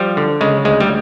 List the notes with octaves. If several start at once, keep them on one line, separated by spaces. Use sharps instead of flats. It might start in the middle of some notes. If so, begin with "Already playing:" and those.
Already playing: F3 G3
D3
C#3 G#3
D2 G#3
G3